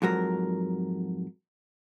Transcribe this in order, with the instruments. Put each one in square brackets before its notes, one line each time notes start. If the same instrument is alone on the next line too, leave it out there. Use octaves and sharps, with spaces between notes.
[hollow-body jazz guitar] F2 G#2 F#3 A#4